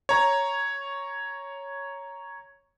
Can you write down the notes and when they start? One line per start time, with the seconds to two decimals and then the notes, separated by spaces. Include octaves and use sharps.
0.09 C#5 A#5